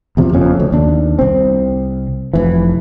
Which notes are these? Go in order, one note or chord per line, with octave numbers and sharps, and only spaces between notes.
E2 C3 F3
F#1 F2 C#4
D2
D#2 D4
C2 C4
F1 E3